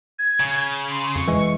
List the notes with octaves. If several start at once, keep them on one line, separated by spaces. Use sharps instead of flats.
G#6
C#3
C6
F2 C#6
E3 G#3